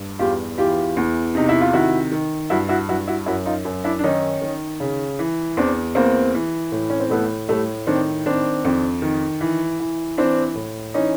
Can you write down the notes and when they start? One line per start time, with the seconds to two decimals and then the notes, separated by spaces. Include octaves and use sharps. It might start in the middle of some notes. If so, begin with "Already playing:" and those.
Already playing: G2
0.19 E2 F4 G4
0.58 E3 F4 G4
0.97 E2
1.35 C3 D#4
1.49 E4
1.61 F4
1.73 D#3 E4 F#4
2.12 D#3
2.50 G2 E4 F#4
2.69 E4 F#4
2.89 G2 E4 F#4
3.07 E4 F#4
3.26 F#2 E4 F#4
3.46 D#4 F4
3.65 F#2
3.84 D4 E4
3.99 D4
4.04 D#3 C#4 D#4
4.42 D#3
4.80 C#3
5.19 E3
5.57 E2 C4 D4
5.95 E2 A#3 C4
6.34 E3
6.72 A2
6.90 C#4
7.00 C4
7.10 A2 A3 B3
7.49 A2 G3 A3
7.87 D#3 C4 D4
8.26 D#3 C4 D4
8.65 F2
9.02 D#3
9.41 E3
9.80 E3
10.18 E3 C4 D4
10.55 A2
10.94 E3 C#4 D#4